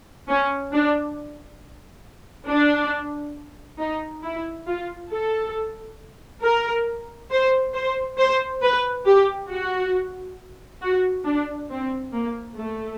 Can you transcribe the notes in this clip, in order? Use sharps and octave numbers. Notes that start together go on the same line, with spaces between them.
C#4
D4
D4
D#4
E4
F4
A4
A#4
C5
C5
C5
B4
G4
F#4
F#4
D4
C4
A#3
A3